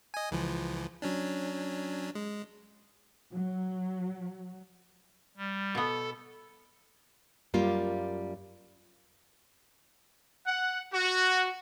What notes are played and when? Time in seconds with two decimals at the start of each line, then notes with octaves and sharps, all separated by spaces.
0.14 D#5 G#5
0.31 C#2 E3 F3
1.02 F#3 C#4 D4
2.15 G#3
3.32 F#3
5.37 G3
5.75 B2 B3 A4
7.54 F#2 G3 A#3 F4
10.46 F#5
10.92 F#4